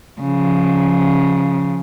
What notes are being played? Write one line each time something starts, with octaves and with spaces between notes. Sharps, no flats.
C#3 F3